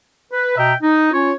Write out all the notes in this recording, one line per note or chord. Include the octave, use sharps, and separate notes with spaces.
B4
B2 D#5 E5 G5 A#5
D#4
C#4 F4 C#5